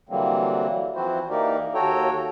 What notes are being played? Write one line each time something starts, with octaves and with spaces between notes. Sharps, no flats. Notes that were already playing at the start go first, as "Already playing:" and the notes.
D3 E3 F#3 G3 A#3 C4
E3 F3 C4 E4 F#4 C5
E3 A#3 D#4 G4 A#4 D5
D#2 F#4 A4 C#5 G5 A#5